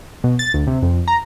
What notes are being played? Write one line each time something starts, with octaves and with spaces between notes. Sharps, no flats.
B2
A6
D2
C3
F2
A#5